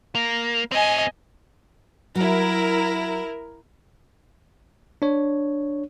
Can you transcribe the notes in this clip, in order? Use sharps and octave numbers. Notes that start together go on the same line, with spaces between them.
A#3
C4 G#4 D#5 G#5
F#3 E4 A#4
D4 C#5